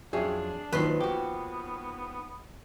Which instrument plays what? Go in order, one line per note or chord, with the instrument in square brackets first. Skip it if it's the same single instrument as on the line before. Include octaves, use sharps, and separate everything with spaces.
[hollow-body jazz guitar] F2 F#3 C#4 [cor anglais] D4 [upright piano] G#4 E5 G5
[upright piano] D#2 F3 [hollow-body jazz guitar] D#3 F#3 [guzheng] B4 C6
[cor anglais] B3 [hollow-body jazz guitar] F#4 G4